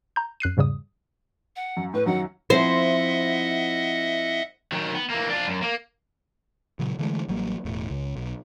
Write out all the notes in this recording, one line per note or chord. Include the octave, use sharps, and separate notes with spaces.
A#5 G6
F#2 F#6 C7 D#7
E2 G#2 C#3 G3 D#6
F#5
F#2
A2 B4
F#2 D#3 F#3 F#5
F3 C4 E4 C5 D#5 E5 F#5
D#3 F#3
B3
E3 A#3
D4 F4
F#2
A#3
A#2 C#3 F#3
D3 E3 G#3 A3
A1 F#3 G3 A#3
E1 A2
C#2
B1